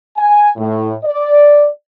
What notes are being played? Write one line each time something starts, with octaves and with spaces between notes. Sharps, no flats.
G#5
A2
D5